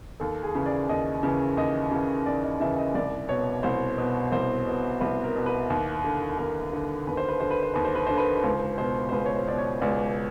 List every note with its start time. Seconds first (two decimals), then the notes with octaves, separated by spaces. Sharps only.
0.20 D#2 A4
0.43 G#4
0.55 C#3 E3
0.66 D5
0.89 D#2 D#5
1.23 C#3 E3
1.57 D#2 D#5
1.91 C#3 E3
2.26 D#2 D5
2.43 D#5
2.60 C#3 E3 E5
2.78 D#5
2.95 C2 D5
3.29 B2 C#5
3.63 C2 C5
3.98 B2
4.32 C2 C5
4.67 B2
5.01 C2 B4
5.24 A#4
5.36 B2
5.46 B4
5.70 D#2
6.04 D3
6.38 D#2 A#4
6.73 D3
7.07 D#2 B4
7.17 C5
7.29 B4
7.40 D3 C5
7.51 B4
7.63 C5
7.74 D#2 B4
7.85 C5
7.95 B4
8.07 D3 C5
8.17 B4
8.35 B4
8.44 C#2 C5
8.78 B2 C5
9.09 C5
9.12 C#2 B4
9.26 C#5
9.36 C5
9.47 B2 D5
9.58 C#5
9.82 C#2 D5